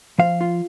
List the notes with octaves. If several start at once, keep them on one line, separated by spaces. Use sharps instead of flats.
F3 F5
F4